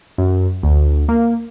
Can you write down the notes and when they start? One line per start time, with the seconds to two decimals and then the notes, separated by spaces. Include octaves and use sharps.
0.18 F#2
0.63 D2
1.09 A#3